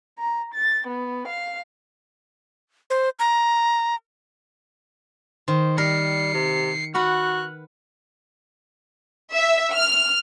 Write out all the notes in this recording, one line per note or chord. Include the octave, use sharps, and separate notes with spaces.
A#5
A6
B3
F5
C5
A#5
D#3 C5
G3 A#4 C7 C#7
C3
F#4 B4 F#5 F6 F#6
E5
F6